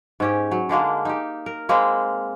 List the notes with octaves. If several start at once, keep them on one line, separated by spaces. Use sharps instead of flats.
G#2 C#4 G4
F#3
D3 G#3 A#3 D4
D#4 G4
A#4
G#3 A#3 C4 B4